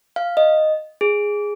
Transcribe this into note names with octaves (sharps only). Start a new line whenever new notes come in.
F5
D#5
G#4